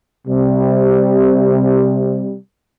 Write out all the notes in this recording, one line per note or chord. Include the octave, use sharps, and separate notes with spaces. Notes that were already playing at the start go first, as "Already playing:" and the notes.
C3 G3